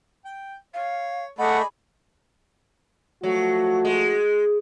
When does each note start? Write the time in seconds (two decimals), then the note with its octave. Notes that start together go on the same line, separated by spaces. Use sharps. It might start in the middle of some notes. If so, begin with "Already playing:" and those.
0.25 G5
0.74 C#5 F5
1.39 A3 G#4 D5 D#5 F#5 B5
3.23 F3 F#3 A3 F#4
3.85 G#3